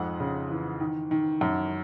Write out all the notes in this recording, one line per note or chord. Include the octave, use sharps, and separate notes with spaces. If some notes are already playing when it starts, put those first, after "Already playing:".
Already playing: F2 G#2 F#5
C#3
E3
D#3
D#3
F#2